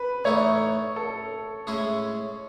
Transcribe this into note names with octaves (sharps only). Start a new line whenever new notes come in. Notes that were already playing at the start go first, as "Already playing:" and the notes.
Already playing: B4
A2 E3 A3 D#4 C#5
A4
A2 G#3 C#4 E4 G#4